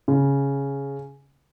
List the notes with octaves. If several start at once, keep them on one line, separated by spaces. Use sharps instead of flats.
C#3